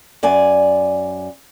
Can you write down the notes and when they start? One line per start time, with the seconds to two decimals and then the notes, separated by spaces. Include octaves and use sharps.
0.23 F#2 D5 G#5